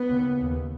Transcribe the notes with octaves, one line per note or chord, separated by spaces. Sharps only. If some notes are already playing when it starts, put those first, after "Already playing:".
Already playing: B3
D#2 C#3
D#2 C#3